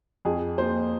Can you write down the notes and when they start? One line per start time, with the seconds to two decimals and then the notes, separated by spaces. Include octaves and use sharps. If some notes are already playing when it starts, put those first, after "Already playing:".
0.25 F2 G#4
0.58 A#3 C5